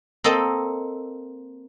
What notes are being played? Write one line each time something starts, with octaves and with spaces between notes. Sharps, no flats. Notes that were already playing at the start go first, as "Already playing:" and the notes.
A#3 C4 A4 D#5